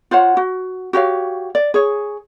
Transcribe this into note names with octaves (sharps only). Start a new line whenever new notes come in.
F4 C5 C#5 F#5
F#4
F#4 G4 C#5 F5
D5
G#4 C#5